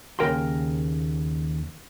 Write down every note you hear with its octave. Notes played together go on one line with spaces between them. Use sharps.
D#2 C#3 A#4 G5 G#5 C6